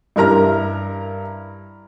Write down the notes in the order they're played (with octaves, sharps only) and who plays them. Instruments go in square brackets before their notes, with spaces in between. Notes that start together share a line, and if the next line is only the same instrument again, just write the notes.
[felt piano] G2 E4 A#4 A#5 F6